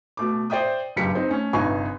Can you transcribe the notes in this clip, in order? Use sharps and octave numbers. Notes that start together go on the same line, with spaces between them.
B2 A3 D6
C5 D5 E5 G5 D#6
F#1 G2 G4 B6 C#7
C4 D#4
A3 C#4
G1 G2 C3 D#4 G#5 C#6